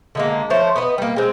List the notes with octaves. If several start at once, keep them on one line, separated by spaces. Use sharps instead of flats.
D3 G#3 A#3
F3 A3 C5 C#5
B3 B4 D#5
G3 A#3
G#3 C4